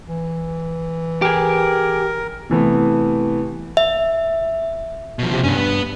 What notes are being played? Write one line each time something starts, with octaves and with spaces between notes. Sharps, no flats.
E3
G4 G#4 A#4
C3 E3 A3 B3
E5
B2 F3
C3
G2 B3 C#4
B3